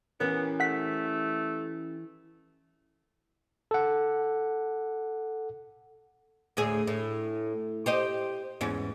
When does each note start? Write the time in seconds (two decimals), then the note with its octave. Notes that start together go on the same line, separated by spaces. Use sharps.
0.20 E3 B3 C#4 G4 A#4 C#5
0.60 A3 F#5 B6
3.71 A4 F#5
6.57 D2 A2 G#4
6.87 A2
7.86 G4 C5 D#5
8.61 E2 G#2 C#4